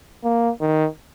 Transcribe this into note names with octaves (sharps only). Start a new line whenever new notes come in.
A#3
D#3